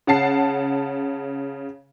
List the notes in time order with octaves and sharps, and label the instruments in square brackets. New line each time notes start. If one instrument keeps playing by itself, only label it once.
[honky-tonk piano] C#3 F#5 A5 C7